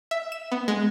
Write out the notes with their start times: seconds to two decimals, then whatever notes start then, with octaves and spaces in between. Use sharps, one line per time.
0.11 E5
0.32 E7
0.52 B3
0.68 G#3